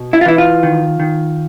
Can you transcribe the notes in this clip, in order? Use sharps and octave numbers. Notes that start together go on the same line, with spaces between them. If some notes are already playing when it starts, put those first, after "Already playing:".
Already playing: B2
E4
F4
E3 E4
F4
D#3
D#3